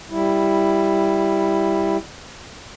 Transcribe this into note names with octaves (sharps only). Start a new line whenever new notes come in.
G3 E4